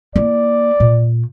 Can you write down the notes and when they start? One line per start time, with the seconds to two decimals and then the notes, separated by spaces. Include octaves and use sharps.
0.16 A#3 E4 D5
0.80 A#2